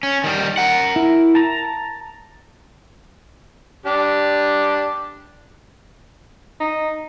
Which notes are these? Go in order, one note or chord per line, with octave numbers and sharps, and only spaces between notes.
C#4
D#3 G3
A#4 F#5
E4
A5 A#5
D4 G4
D#4